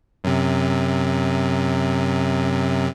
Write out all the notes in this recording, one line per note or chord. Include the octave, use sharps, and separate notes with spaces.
F#2 C3